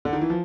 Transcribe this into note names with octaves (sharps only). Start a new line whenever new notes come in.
D3
D#3
E3
F3